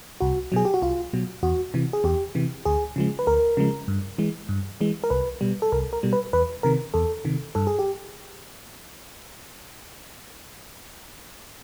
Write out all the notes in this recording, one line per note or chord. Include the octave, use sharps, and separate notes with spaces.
C2 F#4
B2 F#3 G#4
G4
F#4
C2 F4
B2 F#3
E2 F#4
C3 E3
G#4
E2 G4
C3 E3
D2 G#4
C#3 F3 G#3
B4
D2 A#4
C#3 F3 G#3
G2
E3 G#3
G2
E3 G#3
A#4
C2 B4
B2 G3
A4
C2 A#4
A#4
B2 G3
B4
E2 B4
C3 D#3 A#4
E2 A4
C3 D#3
G2 A4
G#4
G4